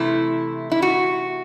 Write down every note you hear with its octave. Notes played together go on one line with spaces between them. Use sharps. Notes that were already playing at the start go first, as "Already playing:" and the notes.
Already playing: C3 E3 A3 E4
E4
F#4